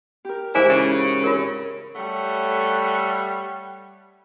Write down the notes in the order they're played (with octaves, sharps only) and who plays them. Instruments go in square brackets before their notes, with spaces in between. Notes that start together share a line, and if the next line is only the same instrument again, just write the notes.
[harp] G4 A#4
[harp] G#2 E3 G4 [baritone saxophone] E4 [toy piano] G#4 C5 G#5
[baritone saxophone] C#3
[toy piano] F4 A#4 [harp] G#4 C#5
[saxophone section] G3 A3 C#5 F#5